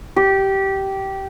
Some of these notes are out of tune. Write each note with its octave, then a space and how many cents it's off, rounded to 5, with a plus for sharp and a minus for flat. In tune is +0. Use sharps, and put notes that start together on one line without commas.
G4 -15